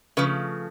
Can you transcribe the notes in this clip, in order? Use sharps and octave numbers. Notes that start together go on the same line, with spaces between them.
C#3 F3 A3 B4